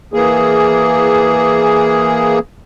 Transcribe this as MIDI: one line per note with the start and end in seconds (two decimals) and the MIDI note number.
0.14 2.39 52
0.14 2.39 58
0.14 2.39 68